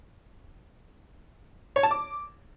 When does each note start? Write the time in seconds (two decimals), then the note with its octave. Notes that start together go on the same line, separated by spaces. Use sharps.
1.76 C#5
1.83 A5
1.91 D6